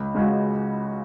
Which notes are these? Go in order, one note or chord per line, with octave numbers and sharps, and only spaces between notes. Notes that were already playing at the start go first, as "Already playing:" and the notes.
Already playing: C#2
C#3 G#3 C#4 F#4